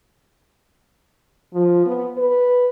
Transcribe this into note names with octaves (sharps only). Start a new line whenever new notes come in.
F3
B3
B4